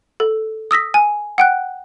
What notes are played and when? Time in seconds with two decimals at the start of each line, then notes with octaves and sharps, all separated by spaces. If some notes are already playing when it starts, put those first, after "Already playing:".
0.20 A4
0.71 D#6 E6 A#6 B6
0.94 G#5
1.38 F#5 G5 F#6